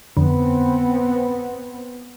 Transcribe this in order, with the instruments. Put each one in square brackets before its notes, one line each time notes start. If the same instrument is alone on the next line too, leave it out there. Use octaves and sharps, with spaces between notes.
[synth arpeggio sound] F2 D3 [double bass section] B3 C4